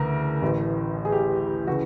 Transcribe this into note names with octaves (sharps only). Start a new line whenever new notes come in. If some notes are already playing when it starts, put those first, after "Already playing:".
Already playing: D2 C#3 E3 A#4
A1 A2 E3
G#4
G4
G#4
C#3 E3 F#4